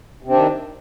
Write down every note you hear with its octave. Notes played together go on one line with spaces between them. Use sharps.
C3 D#3 C4 D4